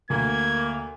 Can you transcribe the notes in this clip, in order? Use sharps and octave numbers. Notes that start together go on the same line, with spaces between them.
D2 A#3 G#6